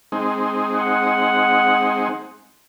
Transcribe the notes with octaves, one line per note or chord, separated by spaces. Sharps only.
G#3 C4 D#4
F#5